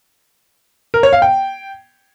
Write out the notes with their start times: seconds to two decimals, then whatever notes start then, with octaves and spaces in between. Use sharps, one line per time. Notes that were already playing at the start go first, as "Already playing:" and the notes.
0.94 A#4
1.03 C#5
1.13 F5
1.22 G5